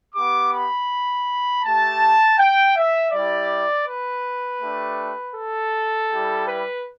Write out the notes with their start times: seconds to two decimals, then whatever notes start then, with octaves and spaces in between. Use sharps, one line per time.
0.14 B3 G4 D6
0.51 B5
1.63 A3 G4 A5
2.37 G5
2.75 E5
3.11 G3 E4 G4 D5
3.86 B4
4.61 A3 D4 G4
5.34 A4
6.09 G3 E4 G4
6.47 B4